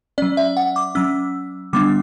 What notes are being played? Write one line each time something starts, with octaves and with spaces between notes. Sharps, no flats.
F#3 C#4 D5
E5
F#5
D6
F#3 C#4 E6
D3 G3 B3 D4 D6